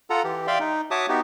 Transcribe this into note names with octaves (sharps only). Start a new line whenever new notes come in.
F4 A4 F#5 A#5
E3 G4
D5 E5 F5 G5 C6
D#4
F#4 C#5 E5 A5 D6 D#6
B3 D#4 F#4 G4